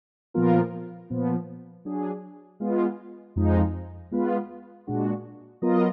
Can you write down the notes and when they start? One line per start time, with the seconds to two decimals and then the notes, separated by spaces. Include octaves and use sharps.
0.34 A#2 F3 B3 F4 A#4
1.10 A#2 F3 B3
1.85 F#3 D4 G#4
2.60 G#3 B3 F4
3.36 F2 F3 G#3 D#4
4.11 G#3 B3 F4 B4
4.87 A#2 G#3 D4 F#4
5.62 F#3 B3 F4 A#4 D#5